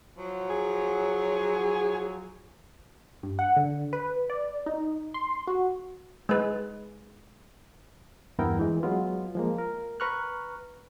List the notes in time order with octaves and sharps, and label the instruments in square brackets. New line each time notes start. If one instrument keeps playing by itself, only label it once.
[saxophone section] F3 F#3
[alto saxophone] G#4
[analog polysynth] G2
F#5
D3
B4
D5
D#4
C6
F#4
[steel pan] G#3 B4
[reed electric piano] E2 G2 B3 E4 A#4 G5
E3 G#3
F#3 G#3 B3 F4
F3 G#3 A#3
A#4
B4 A#5 C#6 F6 F#6